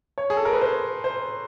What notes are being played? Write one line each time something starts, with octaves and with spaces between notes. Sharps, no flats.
C#5
G#4
A4
A#4
B4
C5
C5